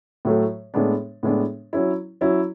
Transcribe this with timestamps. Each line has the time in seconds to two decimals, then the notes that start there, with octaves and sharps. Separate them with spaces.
0.25 A2 F#3 A3
0.74 A2 G#3 B3 D4
1.23 A2 G#3 B3 D4
1.73 F#3 C#4 E4
2.21 F#3 C#4 E4